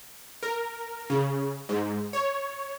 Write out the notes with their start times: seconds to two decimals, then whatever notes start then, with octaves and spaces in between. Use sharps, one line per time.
0.43 A#4
1.10 C#3
1.69 G#2
2.13 C#5